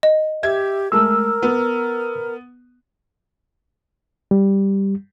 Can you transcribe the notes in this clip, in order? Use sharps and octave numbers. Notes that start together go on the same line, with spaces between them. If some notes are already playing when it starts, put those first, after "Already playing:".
D#5
G4 E5 G#6
G#3 A3 A#4 E6
B3
G3